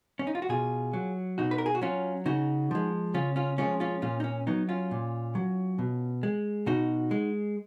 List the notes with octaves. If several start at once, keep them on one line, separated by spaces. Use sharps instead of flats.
C#4
D#4
F4
F#4
B2 F4 G#4
F#3
B2 D#4 F#4
B4
A#4
G#4
F#4
F#3 C#4 F4
C#3 D#4 F#4
F3 G#3
C#3 C#4 F4
C#4 F4
F3 G#3 C#4 F4
C#4 F4
A#2 C#4 F4
D#4
C#4
F#3 B3 D#4
C#4 F4
A#2
F#3
B2
G#3
B2 D#4 F#4
G#3